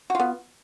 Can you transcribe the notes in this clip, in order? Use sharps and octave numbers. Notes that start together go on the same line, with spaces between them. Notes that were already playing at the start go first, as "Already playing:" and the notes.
B3 F4 F#4